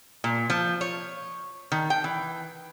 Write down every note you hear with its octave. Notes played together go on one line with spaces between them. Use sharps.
A#2
F3
C#5
D#3
G5
E3